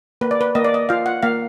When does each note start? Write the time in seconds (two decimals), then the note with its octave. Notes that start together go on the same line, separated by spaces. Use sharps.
0.21 A#3 B4
0.31 D5
0.41 B4
0.55 A#3 D#5
0.65 D5
0.74 D#5
0.89 F4 F5
1.06 F#5
1.23 A#3 F5